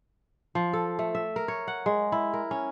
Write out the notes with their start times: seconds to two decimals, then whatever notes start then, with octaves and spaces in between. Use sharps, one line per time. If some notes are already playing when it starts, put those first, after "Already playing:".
0.55 F3
0.73 A4
0.99 A3
1.15 E5
1.36 A#4
1.48 C#5
1.67 F#5
1.86 G#3
2.12 E4
2.33 A#4
2.51 C#4